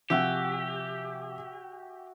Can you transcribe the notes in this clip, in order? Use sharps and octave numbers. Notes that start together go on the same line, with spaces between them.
C3 F3 F#4 G4 E5 G#5